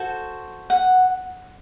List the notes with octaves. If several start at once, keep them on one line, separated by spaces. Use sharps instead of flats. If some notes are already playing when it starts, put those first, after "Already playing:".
Already playing: F#4 A4 C5
F#5